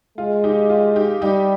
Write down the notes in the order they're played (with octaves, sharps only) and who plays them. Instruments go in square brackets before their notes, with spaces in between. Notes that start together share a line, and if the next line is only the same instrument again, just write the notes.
[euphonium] G#3 [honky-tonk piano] F4
[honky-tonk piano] D#4 G4
F4
D#4 G4
[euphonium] G3 [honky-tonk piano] D#4 G4